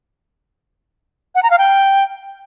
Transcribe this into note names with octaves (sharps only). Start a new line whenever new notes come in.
F#5
A#5
F5
G5